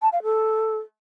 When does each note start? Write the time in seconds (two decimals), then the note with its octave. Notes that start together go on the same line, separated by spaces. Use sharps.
0.02 A5
0.12 F5
0.23 A4